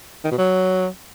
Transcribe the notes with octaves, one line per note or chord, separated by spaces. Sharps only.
D#3
B2
F#3